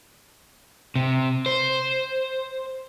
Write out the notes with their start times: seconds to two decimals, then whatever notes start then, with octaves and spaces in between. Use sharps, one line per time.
0.96 C3
1.46 C5